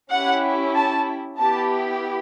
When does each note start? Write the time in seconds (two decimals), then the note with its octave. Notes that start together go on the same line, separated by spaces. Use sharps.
0.11 C#4 E4 G4 F#5
0.75 A5
1.38 B3 E4 G4 A5